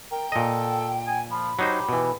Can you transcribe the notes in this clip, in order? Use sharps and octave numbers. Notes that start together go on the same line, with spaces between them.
A#4 G5
A#2 A4 D#5
G#5
F3 B5
F#3 D#4 G4 C5
B2 E3